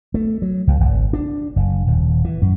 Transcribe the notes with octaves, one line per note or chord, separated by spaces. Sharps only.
A3
F#3
C#2
G#1
D4
F#1
D#1
E3
F#2